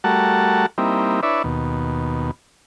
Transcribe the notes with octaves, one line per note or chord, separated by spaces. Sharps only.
G3 A3 F#4 A#4 F#5 A5
G3 A#3 C4 D#4 E4
D4 E4 B4 C#5 D5 E5
D#2 B2